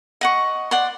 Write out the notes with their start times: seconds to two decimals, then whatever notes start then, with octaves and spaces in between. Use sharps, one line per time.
0.21 D#5 F#5 C#6
0.71 D5 F#5 C6